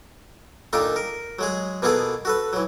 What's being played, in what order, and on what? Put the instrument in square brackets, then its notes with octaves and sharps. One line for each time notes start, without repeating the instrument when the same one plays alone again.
[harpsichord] A#2 D#3 D4 D#4 F4 A4
A#4
F#3 G#3 G#4
B2 A#3 B3 F4 G#4 A4
F#4 A4 B4
E3 F#3